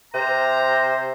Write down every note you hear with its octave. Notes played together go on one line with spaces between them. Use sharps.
C3 C5 A#5